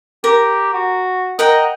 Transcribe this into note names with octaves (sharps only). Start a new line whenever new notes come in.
G4 A#4
F#4
A#4 D#5 F#5 G5